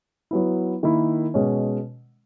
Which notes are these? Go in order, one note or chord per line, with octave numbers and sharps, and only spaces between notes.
F#3 B3 E4
D#3 A#3 E4
B2 G#3 C#4